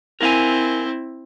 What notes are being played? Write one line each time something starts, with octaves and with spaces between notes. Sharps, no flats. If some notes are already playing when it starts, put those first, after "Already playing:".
C4 E4 A#4 F5 G#5